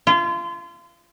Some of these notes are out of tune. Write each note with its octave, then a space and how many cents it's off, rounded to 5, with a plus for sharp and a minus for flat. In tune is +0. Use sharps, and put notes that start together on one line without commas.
F4 -30